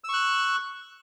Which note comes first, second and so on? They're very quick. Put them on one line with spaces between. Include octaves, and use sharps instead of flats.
E6 C#6 F#6